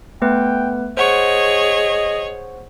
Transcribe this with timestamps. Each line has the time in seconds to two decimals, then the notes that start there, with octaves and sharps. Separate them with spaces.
0.22 A3 B3 B4 G5
0.97 G#4 C5 C#5 D#5 F#5 C#6